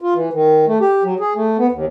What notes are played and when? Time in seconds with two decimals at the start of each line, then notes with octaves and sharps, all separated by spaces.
0.01 F4
0.15 E3
0.33 D#3
0.67 A3
0.81 G4
1.04 F#3
1.20 G#4
1.35 A3
1.58 B3
1.72 D#2